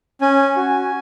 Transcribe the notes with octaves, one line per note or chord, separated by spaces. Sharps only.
C#4 G#5
F#4